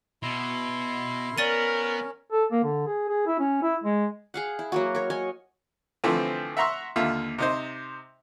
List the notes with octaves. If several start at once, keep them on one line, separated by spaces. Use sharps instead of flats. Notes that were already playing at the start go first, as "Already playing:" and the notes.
B2 E4 C6
B3 C#4 A#4 D5 A6 D#7
A4
A#3
D3
G#4
G#4
E4
C#4
E4
G#3
G#4 F5 F#5
E4
F#3 A#3 F#4
A#4 C#5
C#5 D#5 G#5
D3 E3 F3 A3 C4
E5 F#5 A#5 C6 C#6 E6
D#2 D3 F4 E5
C3 D#4 C5